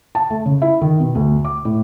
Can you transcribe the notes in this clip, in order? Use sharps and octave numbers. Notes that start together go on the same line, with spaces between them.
A5
A3
C#3
E4
D#3
B2
D2
D6
A2